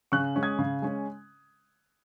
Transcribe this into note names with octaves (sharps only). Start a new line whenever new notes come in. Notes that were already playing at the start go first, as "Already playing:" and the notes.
C#3 C#6 F#6
G#3 C#4
D#6 G#6
C#3
G#3 C#4